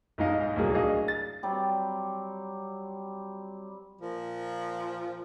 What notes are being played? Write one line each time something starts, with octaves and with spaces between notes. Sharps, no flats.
B1 G#2 G#3 D#4 D#5 F5
D1 C2 A#2 F#3 A#3 G#4
D4 F#4 G#4 D#5 F5
A6
F#3 G3 C4
A#2 F3